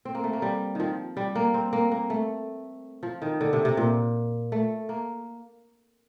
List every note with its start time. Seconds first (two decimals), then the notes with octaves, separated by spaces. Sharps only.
0.05 C4
0.15 A#3
0.24 A3
0.33 A#3
0.42 G3
0.75 D#3 F3
1.17 G3
1.35 A#3
1.54 C4
1.73 A#3
1.91 A#3
2.10 A3
3.03 F3
3.22 D#3
3.41 D3
3.53 C3
3.65 C3
3.77 A#2
4.52 A3
4.89 A#3